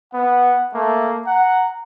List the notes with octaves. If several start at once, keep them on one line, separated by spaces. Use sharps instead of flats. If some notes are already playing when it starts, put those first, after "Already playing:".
B3 F#5
A3 A#3
F#5 A#5